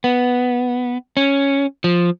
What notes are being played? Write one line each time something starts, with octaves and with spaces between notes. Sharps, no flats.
B3
C#4
F3